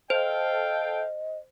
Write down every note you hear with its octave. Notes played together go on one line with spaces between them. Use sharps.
A4 C5 D#5 F5 G5